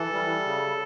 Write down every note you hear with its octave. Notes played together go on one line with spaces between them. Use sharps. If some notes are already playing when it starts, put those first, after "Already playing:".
Already playing: E3 A4
G3
C#3